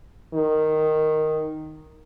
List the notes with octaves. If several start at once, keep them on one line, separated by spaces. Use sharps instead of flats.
D#3